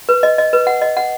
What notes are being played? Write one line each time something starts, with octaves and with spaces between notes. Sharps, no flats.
B4
D#5
D#5
B4
F#5
D#5
F#5